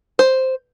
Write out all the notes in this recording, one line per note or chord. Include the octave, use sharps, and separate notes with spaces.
C5